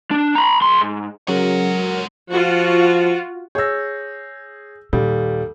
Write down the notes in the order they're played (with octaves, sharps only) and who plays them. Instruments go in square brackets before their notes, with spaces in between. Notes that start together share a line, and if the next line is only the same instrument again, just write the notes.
[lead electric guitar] D4
A#5 B5
B1 C6
G#2
[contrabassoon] C#3 [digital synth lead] F#3 [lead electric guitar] G#3 F#5 [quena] A#4
[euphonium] F3 [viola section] F4 F#4
[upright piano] G#4 E6 [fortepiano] C#5 [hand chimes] G6 A#6
[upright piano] D#2 [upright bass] A#2 [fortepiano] G3 [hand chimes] A4